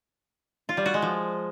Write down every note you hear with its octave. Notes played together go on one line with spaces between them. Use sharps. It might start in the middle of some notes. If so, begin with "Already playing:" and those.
F4
G3
F#4
G#3
F3